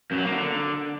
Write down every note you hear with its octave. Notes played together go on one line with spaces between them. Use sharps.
F#2
F#3
A#3
D3